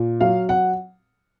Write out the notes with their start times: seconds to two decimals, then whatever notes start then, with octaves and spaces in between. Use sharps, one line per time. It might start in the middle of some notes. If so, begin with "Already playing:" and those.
Already playing: A#2
0.21 F#3 F5
0.49 F#5